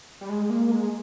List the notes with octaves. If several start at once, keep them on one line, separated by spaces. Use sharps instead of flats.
G3
G#3
A#3
G#3